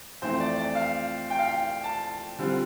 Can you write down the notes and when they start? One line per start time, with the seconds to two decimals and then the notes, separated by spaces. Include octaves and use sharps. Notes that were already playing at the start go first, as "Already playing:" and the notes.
0.22 F2 E3 A3 C4 C5
0.40 D5
0.58 D5
0.75 F5
1.30 G5
1.39 F5
1.47 G5
1.84 A5
2.38 D3 G3 C4 F4